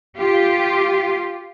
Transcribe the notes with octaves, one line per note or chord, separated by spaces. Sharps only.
F4 G4